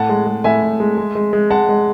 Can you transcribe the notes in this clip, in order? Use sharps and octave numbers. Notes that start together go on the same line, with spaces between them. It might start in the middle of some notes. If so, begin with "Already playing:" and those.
Already playing: A2 F#5 A5
G#3
G#3
A2 E5 G#5
A2
G#3
G#3
G#3
G#3
G#3 F#5 A5
G#3